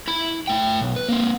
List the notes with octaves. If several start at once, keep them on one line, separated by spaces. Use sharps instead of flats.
E4 B5
A3 G5
B1
B4
A#3 C4